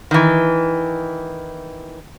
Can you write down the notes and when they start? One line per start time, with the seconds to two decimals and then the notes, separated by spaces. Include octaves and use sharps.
0.11 D#3 E3